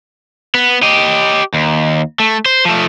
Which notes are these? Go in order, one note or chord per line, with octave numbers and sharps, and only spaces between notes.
B3
G4 D#5
D#2
A3
C5
F3 A3